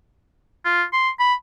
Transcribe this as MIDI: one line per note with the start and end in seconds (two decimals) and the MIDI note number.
0.65 0.83 65
0.93 1.09 84
1.20 1.34 83